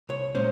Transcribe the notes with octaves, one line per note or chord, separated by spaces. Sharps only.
C2 C#5
A#2 G#3 C#4 C5